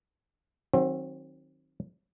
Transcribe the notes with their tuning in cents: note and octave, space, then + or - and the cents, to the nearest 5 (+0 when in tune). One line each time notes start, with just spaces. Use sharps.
D#3 +0 F#3 +0 C4 +25